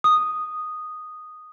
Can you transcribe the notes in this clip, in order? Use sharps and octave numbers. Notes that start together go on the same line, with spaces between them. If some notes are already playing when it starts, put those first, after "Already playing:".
D#6